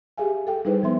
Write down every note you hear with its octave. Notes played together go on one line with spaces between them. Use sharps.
G4 G#4 E5 F5 G#5
A4 F5 G5
G3 D#4 E4 G#4 B4 C5
F3 B3 E5 C6